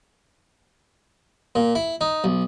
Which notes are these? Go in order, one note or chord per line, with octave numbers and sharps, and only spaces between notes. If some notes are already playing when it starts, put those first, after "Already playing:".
A#2
E4
D#4
B1